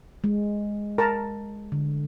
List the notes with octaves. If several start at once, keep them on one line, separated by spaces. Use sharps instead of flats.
G#3
A#4 A5 A#5
D3